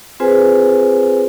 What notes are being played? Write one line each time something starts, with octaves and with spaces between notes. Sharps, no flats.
C4 F4 G#4 B4 C5 G#5